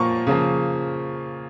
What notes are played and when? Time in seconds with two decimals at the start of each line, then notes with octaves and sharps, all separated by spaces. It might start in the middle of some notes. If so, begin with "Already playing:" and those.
Already playing: A#2 F3 A#3 C#6
0.27 C#3 F3 A#3